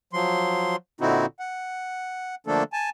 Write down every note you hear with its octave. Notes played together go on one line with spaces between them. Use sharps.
F3 F#3 C6
A#2 D3 C4 D#4 E4 F#4
F#5
D3 F3 A3 A#3 D4 A4
G#5 A5